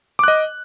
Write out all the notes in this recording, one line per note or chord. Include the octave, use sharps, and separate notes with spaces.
D#5 D6 F#6